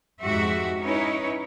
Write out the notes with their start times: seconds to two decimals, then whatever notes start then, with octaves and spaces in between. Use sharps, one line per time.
0.22 F2 G#2 F#4 G4 E5
0.83 C#4 D#4 E4 B4 C#5